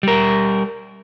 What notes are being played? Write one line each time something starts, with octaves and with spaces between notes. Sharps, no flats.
G3 A#4